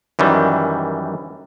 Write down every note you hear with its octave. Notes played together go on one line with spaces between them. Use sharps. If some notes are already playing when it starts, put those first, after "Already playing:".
F#2 D#3 E3 G3